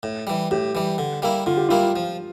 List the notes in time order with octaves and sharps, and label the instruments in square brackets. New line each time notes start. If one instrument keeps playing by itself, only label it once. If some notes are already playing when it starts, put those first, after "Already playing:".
[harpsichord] A2
E3 G3
[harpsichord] A2 [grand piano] G4
[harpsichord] E3 G3
D3
G3 A#3 E4
[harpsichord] D3 [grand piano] F4
[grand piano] G4
[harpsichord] G3 A#3 E4 [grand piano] F4
[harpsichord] F3